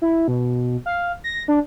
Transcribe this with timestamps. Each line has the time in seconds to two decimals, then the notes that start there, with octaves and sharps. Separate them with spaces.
0.02 E4
0.28 B2
0.86 F5
1.24 A#6
1.48 D4